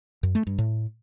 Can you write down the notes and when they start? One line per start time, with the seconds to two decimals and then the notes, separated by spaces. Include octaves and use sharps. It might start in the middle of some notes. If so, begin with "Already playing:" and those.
0.23 F#2
0.35 A3
0.47 G2
0.58 A2